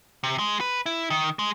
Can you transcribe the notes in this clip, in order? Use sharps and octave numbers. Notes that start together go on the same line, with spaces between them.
C3
G#3
B4
E4
D#3
G#3